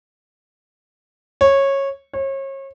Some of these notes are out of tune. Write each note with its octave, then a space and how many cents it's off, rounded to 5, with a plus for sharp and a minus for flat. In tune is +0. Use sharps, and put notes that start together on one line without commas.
C#5 -15
C#5 -35